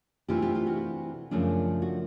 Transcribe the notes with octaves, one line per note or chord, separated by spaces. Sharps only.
C3 E3 A3 D4 F4 G4
F4 G4
F4
F#4
F#2 C#3 F3 A3 D4
F#4